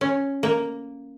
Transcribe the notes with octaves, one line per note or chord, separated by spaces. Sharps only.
C#4
A#3